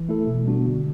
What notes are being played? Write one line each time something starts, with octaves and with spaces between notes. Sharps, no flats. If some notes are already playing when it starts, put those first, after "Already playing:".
Already playing: E3
A3 E4 A4
B2
G3 B3 D4 F#4
D3